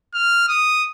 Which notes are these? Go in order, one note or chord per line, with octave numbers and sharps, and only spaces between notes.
F6
D#6